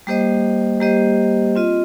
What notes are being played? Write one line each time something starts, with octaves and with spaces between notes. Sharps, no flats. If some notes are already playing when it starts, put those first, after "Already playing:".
G3 A#3 G4 C5 D#5
G3 A#3 G4 C5 D#5
C4 F4 D#5